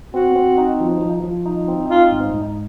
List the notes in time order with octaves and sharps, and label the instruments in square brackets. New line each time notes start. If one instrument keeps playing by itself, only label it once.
[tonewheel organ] C4 [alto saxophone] F#4
[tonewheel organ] C4
D#4
F3
F3
F3
D#4
C4
[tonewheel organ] D#4 [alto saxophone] F4
[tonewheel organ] G#2
G#2